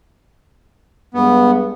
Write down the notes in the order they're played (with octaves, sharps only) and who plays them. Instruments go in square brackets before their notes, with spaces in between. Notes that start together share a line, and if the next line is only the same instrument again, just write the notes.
[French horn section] G2 G#3 [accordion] B3